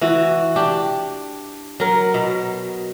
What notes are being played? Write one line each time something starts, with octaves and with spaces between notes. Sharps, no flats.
E3 F#4
D4 G4
F#3 A#4
B2